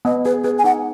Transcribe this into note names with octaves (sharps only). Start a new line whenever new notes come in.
B3 D#5
G#4 B4
G#4 B4
G#5
D#4 F#5